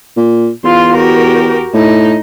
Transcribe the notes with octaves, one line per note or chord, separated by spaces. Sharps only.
A#2
E2 F4 C6
F#4 G4 A#4
A2 D#4